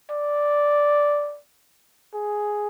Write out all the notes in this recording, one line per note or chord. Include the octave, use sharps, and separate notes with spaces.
D5
G#4